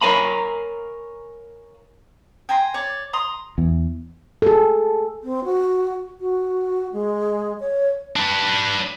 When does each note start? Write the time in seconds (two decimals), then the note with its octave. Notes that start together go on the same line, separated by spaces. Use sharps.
0.01 A#4 C#5 F5 G#5 A#5 B5
2.49 G5 G#5 A#5 C6
2.74 C#5 D5
3.13 A#5 C6 D#6
3.58 E2
4.42 G#4 A4
5.23 C4
5.44 F#4
6.20 F#4
6.93 G#3
7.60 C#5
8.16 D4 B4